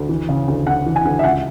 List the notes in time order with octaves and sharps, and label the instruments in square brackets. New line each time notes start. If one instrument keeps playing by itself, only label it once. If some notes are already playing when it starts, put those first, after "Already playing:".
Already playing: [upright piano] D2
E3
C#3
D2
D2 F#5
E3
G#5
D2
E5
C#2 F#5